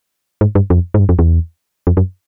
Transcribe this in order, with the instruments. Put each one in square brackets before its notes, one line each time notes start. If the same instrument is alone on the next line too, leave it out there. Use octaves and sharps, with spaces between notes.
[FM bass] G#2
G2
F2
G#2
G2
F2
E2
F2
F#2